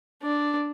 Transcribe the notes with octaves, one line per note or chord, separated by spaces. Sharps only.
D4